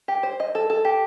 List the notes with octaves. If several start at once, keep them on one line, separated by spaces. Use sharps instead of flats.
G4
C5
D#5
A4
A4
G4